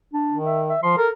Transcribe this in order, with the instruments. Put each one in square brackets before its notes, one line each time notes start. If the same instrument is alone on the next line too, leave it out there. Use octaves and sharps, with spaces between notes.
[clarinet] D4
[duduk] D#3
[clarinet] E5
E5
[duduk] F3 [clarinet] C6
[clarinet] A4 [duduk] A#4